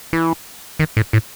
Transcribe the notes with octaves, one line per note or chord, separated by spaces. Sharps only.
E3
D#3
A2
A2